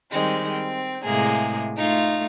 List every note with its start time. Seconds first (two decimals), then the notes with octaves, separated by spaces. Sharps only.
0.12 D#3 G3 G#3 C4
0.51 C4
1.04 A2 C3 G#3 A#3 G#4
1.78 A3 D#4 F4